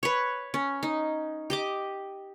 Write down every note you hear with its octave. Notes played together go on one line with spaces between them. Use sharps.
B4 C#5
C#4
D#4
G4 D#5 D6